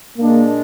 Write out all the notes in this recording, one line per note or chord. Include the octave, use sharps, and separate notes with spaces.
A#2 G#3 A#3 D4 G#4